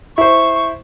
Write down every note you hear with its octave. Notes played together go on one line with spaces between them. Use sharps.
E4 C5 C#6